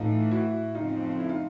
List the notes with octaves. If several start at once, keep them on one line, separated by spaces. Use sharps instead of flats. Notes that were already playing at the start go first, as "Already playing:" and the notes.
Already playing: A2 E3 A3 D#4 F4
E4 F#4
F2 C#3 F3 A3 C4 D#4 F4
E4
D#4 F4